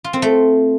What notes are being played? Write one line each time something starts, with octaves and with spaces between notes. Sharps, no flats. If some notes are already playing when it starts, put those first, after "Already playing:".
F4
C4
A3